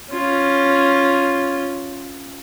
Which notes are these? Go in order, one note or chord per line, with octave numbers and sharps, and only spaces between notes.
C#4 F4